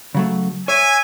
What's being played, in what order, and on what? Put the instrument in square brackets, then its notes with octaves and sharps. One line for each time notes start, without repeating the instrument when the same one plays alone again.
[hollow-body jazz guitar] C#3 F#3 A3
[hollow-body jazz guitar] C#5 [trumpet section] E5 G#5